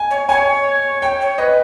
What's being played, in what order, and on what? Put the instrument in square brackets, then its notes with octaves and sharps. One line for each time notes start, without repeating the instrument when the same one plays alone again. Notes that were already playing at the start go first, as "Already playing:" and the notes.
Already playing: [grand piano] G#5
[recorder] C#5
[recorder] C#5 [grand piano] G#5
[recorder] C#5 [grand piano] G5
[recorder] C#5
[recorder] B4 [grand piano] D#5